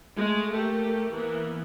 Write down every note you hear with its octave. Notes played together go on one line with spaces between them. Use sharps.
G#3 A3
A3 A#3 G4
E3 A#3 B3